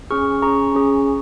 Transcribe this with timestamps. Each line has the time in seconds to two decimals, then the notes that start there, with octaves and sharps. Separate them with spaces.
0.11 C#4 G#4 C#6 F6
0.42 C#4 G#4 A#5 C#6
0.75 C#4 G#4